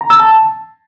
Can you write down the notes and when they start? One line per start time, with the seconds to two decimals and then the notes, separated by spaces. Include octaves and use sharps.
0.01 A#5
0.10 E6
0.19 A5